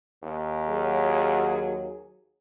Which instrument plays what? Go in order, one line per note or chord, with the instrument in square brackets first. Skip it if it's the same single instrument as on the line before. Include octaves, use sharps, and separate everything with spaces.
[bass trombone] D#2
[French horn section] F#3 G#4